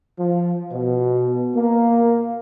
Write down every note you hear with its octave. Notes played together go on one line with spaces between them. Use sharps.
F3
B2
A#3